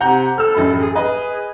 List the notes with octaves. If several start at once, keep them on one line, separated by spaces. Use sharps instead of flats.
C3 F#5 A#5 G6
A4 E6 F6
A1 F#2 B5
G#4
G#4 B4 D#5